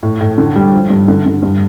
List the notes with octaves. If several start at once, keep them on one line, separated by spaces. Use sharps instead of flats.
A2
A2
D3
G3
F3
G2
D3
D3
G2